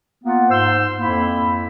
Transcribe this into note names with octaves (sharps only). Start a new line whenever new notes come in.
A#3 B3 F4 F#5
G#2 C5 C6 E6
F2 A#3 E4 B5